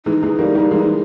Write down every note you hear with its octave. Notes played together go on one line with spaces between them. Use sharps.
E3 G#3 D#4
E3 G#3
G3 A#3
G3 A#3
E3 G#3